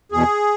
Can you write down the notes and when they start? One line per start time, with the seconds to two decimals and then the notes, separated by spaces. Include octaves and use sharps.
0.12 E2 B2 G#4